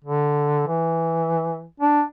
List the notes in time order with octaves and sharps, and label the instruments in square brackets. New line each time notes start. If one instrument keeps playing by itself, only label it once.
[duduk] D3
E3
D4